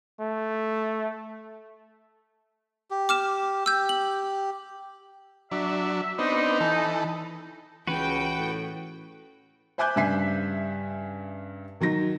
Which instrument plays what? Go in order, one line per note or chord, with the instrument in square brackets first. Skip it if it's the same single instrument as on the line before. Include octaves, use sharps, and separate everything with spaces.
[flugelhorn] A3
[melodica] G4
[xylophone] D6 F6 E7
[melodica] G4 [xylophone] E6 G6
[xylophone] F#7
[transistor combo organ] F#3 D4 [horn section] E5
[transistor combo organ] B3 C4 D4 [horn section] D#4
[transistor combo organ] E3 A4
[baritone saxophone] C#2 [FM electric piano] E3 C#4 [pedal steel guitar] F#4 B4 [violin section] G5
[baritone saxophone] A2
[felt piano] C5 E5 G#5 D6 F#6 G6
G2 C#3 E5 G#5 B6 C7
D#3 F#3 D#4 A#6